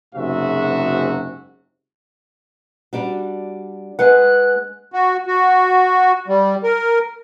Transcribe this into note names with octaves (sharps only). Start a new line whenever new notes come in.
F#1 G#2 C3 F#4 E5
G3 D4 F#4
G#3 B4 F#5 F#6
F#4
F#4
G3
A#4